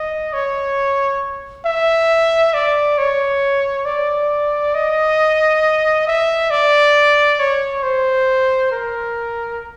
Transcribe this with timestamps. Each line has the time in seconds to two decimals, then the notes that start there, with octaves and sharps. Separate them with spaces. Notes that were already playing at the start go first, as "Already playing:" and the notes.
Already playing: D#5
0.33 C#5
1.66 E5
2.54 D5
2.98 C#5
3.85 D5
4.75 D#5
6.07 E5
6.51 D5
7.39 C#5
7.83 C5
8.72 A#4